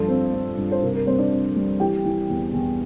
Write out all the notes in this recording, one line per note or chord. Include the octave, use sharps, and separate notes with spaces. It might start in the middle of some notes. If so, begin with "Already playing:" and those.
Already playing: G2 F3 A4
C4
C4
G2
C5
C3 A#4
A#4
G3 C4 C5
D4 D5
C4
G3
E3 G4 G5
E3
E2
E2